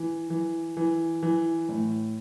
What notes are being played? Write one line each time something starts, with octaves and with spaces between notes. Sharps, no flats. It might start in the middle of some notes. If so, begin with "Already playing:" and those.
Already playing: E3
E3
E3
E3
A2